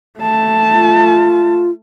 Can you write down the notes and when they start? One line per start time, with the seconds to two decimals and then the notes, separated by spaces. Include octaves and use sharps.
0.20 A3 A5
0.71 F4